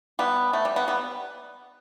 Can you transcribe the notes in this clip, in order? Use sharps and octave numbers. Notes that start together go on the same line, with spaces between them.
G3 B3
A3
G3
G3 B3
G3 B3